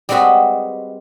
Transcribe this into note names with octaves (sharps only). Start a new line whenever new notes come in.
G3 G#3 C4 F#4 B4 D#5